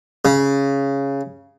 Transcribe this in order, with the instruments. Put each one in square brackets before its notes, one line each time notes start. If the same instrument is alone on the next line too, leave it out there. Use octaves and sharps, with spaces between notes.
[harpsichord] C#3